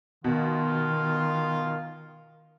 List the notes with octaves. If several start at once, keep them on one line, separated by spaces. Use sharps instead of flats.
B2 D#3 F4